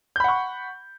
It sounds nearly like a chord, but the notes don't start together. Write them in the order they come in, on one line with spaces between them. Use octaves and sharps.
G6 B5 F#5 C#6